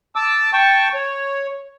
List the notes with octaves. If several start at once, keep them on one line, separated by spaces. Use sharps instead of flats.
A5 D6 E6
G5 A5 C#6
C#5